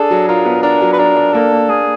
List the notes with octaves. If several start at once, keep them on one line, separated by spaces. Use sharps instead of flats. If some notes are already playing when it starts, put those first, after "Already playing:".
Already playing: D4 G#4 A4
F#3
F4 A#4
B3
D4 A#4
F#3
B4
D4 A#4
D4
A#3 A4
A#3
A#3 G#4